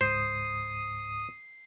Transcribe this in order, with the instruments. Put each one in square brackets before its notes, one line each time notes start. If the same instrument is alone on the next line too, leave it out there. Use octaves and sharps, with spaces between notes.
[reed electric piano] C#2 G#2 [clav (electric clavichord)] C5 [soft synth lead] D#6 [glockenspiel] C7